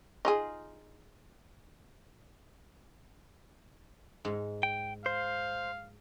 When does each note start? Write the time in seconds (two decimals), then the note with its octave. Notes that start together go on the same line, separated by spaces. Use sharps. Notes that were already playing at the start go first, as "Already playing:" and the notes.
0.25 D#4 F4 G#4
4.25 G#2
4.63 G5
5.06 C5 F5